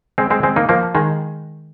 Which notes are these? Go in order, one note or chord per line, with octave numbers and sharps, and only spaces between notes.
G#3 C4
G#3 C4
G#3 C4
A#3 D#4
F3 A#3
D#3 G#3